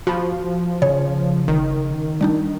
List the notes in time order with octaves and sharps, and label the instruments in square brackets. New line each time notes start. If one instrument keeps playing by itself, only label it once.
[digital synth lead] F3 [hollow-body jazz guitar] F#4 B5
[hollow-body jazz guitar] C#3 [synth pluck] C#5
[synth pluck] G1 [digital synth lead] D#3
[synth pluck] G3 D4 D#4